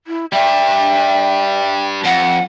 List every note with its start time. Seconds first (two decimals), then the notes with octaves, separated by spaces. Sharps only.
0.07 E4
0.33 G3 D4 E5 G5
2.05 F2 F#5